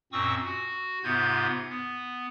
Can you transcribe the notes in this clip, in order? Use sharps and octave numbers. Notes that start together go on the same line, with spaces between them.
F#2 A#2 C4 C#6 D#6 E6
F#4
G#2 C3 B3 F4 G6 G#6
B3